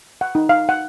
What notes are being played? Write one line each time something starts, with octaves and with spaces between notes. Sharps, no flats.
F#5
D#4
F5
F#5